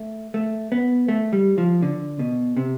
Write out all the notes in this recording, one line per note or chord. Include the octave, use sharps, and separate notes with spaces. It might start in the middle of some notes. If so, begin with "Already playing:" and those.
Already playing: A3
A3
B3
A3
G3
F3
D3
B2
C3